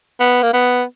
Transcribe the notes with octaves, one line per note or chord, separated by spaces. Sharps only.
B3
A#3
B3